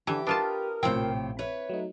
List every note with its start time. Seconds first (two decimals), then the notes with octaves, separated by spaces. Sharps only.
0.07 D3 E3 G4 A5
0.27 D4 F4 A#4 B4 A5 D#6 F6
0.83 A#1 A2 C3 C4 F4 G5
1.39 B4 C#5 E5
1.69 F#3 A3 D#4